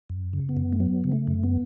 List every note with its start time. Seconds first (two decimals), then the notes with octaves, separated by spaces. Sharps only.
0.10 F#2
0.33 C#3
0.49 B3
0.57 F#2
0.73 A3
0.80 F#3 B3
1.04 C#3
1.12 A3
1.27 F#2
1.43 B3